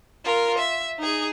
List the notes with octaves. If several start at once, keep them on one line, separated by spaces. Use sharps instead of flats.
F4 A#4
E5
D#4 G#4